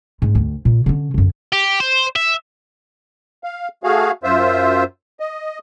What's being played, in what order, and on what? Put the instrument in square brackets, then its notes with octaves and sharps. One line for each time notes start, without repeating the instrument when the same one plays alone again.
[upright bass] G#2 A3
D2
A#2
D3 C#4
F#2 D3
[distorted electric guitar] G4
C5
E5
[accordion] F5
A3 F#4 G#4 F5
F#2 F4 C5 E5
D#5